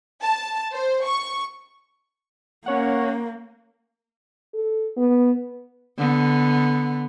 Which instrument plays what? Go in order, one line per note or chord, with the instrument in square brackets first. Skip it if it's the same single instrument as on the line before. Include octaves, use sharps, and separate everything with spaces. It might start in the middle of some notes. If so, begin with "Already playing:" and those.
[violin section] A5
C5
C#6
[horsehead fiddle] A#3 [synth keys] C#4 C#5 F#5
[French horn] A4
B3
[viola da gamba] D3 B3